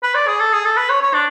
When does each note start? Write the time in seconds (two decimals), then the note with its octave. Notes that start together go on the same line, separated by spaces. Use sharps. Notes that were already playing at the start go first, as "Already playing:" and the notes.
0.03 B4
0.15 D5
0.27 G#4
0.40 A4
0.53 G#4
0.65 A4
0.77 B4
0.89 C#5
1.02 C#5
1.14 D4